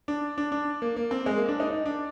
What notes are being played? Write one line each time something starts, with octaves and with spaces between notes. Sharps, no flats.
D4
D4
D4
A#3
A#3
C4
G#3
A#3
D4
D#4
D#4
D4